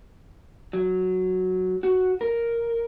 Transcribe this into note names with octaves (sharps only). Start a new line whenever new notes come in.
F#3
F#4
A#4